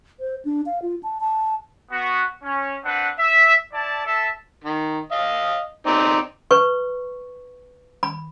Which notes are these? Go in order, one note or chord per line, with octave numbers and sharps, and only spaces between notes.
C5
D4
F5
F4
A5
A5
B3 F#4
C#4
C4 D4 B4 F#5
E5
E4 D5 A5
A4 E5 A5
D#3
D#5 F5
C4 D#4 D5
B4 C#6
B5